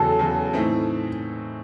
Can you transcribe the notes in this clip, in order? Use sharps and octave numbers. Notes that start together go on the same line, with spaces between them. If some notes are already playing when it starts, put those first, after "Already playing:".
Already playing: E2 C#3 F#3 A4
E2 C#3 F#3
A2 E3 A3 C4 D#4